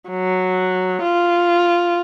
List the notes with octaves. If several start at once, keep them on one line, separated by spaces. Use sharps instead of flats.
F#3
F4